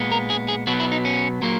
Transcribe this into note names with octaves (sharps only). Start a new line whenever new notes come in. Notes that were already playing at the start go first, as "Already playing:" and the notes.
Already playing: A#2 G#3 B3
A#4
G#4
G#4
B2 F#3 B3 F#4
E4
D#4
C#4
A#2 F#3 A#3